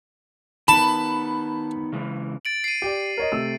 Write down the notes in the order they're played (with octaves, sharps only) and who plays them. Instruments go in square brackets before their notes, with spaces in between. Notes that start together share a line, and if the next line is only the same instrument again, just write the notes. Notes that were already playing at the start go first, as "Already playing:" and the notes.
[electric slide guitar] D#3 B3 [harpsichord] A5 [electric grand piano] B5
[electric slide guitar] C#3 E3 G#3
[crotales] A6 D7 F#7
C7 D#7
[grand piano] G4 D5
A#4 C#5 D#5
C3 A3 E6